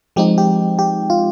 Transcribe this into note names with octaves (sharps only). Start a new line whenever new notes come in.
F3 G#3 C4 D#4 G4
G4
G4
F4